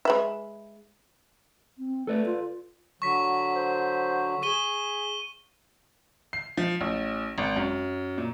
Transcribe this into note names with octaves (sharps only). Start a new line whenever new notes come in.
G#3 B4 E5
C4
A3 A4 B4 D5
F4
D3 F#3 C#6 B6
C5
G#4 C#6 D#7 G7
C7
F3
A1
G#1
F#2
A#2